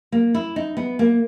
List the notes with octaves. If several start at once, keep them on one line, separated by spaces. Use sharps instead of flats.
A#3
E4
D#4
B3
A#3